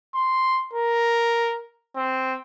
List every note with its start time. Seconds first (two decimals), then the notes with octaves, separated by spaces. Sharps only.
0.15 C6
0.73 A#4
1.96 C4